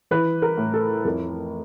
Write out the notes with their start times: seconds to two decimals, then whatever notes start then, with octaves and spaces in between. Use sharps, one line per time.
0.11 E3 B4
0.42 A#4
0.58 A2
0.74 A4
1.05 F2 A#4